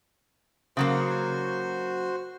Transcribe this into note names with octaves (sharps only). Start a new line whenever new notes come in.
C#3 F#3 A#3 F#4 C5